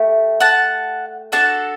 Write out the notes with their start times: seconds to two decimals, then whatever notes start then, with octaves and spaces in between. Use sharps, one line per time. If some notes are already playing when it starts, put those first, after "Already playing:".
Already playing: A3 G4
0.40 F#5 A5
1.32 D4 F#4 A4 F#5 A5